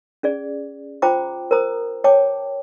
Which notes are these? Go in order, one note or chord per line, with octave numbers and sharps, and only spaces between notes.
C#4 G#4 D5
F4 C5 G5 A#5 D6
A#4 C5 A#5 D#6
C#5 G5 A5 D6